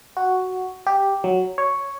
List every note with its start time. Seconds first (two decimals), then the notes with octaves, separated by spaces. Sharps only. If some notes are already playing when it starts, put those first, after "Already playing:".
0.17 F#4
0.87 G4
1.24 F#3
1.58 C#5